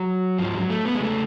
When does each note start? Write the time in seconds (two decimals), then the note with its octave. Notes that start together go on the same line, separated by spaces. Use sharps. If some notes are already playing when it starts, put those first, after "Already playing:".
Already playing: F#3
0.38 G#2 F3
0.55 F#3
0.70 A3
0.85 B3
0.95 G#3
1.00 C#3 A3